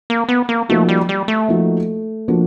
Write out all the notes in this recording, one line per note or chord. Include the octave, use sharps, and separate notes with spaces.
A#3
B3
A#3
F3 A3 A#3 D#4 F#4
G3
G3
A3
F3 A#3 D#4 F#4
F3 A#3 D4 F#4